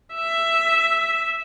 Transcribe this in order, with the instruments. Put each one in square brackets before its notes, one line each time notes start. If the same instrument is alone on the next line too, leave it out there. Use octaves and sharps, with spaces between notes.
[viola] E5